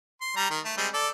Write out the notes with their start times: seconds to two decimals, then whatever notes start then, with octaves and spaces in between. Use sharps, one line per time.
0.21 C6
0.36 G3 A#5
0.50 D#3 A#4
0.65 A3
0.77 G3 G#3 C4
0.94 A4 D5